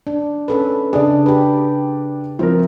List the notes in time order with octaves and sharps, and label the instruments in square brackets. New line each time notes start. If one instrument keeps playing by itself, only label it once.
[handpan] D4
C#4 A4 B4
[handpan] C#3 G#4 [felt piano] D4 D5
[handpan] G4 B4
[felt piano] F3 C4 A#4 [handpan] E4